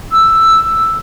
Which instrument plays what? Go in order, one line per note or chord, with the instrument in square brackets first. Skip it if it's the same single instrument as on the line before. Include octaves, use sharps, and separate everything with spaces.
[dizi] E6